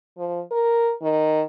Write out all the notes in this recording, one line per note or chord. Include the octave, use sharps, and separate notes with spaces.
F3
A#4
D#3